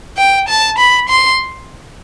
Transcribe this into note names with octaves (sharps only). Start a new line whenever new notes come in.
G5
A5
B5
C6